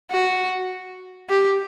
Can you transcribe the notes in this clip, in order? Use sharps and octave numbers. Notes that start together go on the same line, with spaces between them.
F#4
G4